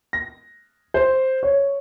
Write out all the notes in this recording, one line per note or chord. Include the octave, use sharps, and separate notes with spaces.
A#6
C5
C#5